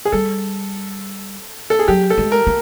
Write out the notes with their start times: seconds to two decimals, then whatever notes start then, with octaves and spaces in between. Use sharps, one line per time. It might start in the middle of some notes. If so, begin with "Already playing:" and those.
0.05 G#4
0.12 G3 A4
1.70 A4
1.79 G#4
1.88 F#3 G4
2.10 A4
2.18 G#3
2.32 A#4
2.47 A#3